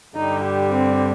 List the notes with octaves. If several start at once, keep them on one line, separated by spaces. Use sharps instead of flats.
G2 D3 G3 D#4
G4
C4